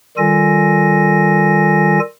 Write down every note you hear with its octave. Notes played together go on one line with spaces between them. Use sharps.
D#3 G3 F4 A4 G#5 A#6